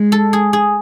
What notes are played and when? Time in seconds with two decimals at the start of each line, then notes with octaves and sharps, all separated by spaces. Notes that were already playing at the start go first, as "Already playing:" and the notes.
Already playing: G#3
0.12 A4
0.33 G#4
0.53 G#4